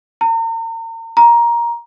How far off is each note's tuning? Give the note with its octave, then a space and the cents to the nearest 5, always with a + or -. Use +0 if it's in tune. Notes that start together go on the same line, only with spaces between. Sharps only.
A#5 -40
A#5 +15